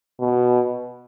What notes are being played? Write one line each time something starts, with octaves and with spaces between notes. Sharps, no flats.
B2